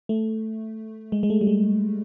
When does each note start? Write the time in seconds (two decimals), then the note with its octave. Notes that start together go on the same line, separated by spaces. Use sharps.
0.09 A3
1.12 G#3
1.23 G#3
1.30 A3
1.41 G3
1.47 G#3